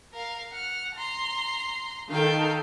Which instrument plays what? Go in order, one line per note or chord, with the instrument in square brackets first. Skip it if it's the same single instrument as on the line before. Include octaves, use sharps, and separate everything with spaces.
[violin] A#4 F5
F#5 F6
A#5 C6
[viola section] D#3 A4 [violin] F5 G5